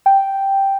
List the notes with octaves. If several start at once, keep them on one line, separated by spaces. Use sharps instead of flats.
G5